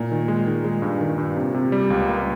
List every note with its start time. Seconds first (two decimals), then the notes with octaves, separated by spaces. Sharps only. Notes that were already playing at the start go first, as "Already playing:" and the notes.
Already playing: A#2
0.12 D#3
0.28 G#3
0.47 D#3
0.65 G#3
0.82 G2
1.01 D#3
1.18 G2
1.37 C3
1.54 C3
1.72 G3
1.90 C#2
2.08 A#3